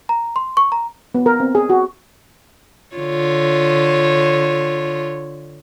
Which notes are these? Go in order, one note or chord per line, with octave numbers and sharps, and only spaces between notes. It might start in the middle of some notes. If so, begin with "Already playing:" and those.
A#5
C6
C#6
A#5
B3
A#4
C4
G#4
F#4
D3 F4 C#5